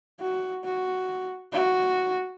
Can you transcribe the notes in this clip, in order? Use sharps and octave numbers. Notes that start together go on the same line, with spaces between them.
F#4
F#4
F#4